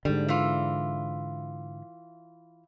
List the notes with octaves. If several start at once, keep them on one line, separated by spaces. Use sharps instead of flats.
G#2 D3 G3
E3 F4